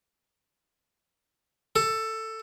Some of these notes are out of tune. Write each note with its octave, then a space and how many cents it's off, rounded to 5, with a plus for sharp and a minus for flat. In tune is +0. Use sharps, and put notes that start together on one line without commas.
A4 +10